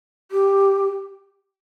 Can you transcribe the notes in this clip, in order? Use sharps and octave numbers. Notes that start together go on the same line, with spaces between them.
G4